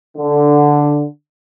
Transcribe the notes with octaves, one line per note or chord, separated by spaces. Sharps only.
D3